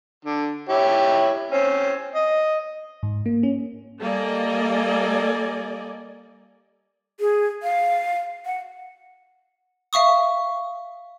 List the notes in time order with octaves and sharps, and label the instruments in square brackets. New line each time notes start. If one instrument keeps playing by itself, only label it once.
[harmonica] D3
E4 G4 C#5
C4 C#4
D#5
[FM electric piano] G#2
A#3
C#4
[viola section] G3 A#3 A4 D5 D#5 G#5
[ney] G#4
F5
F#5
[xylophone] E5 F5 C#6 D#6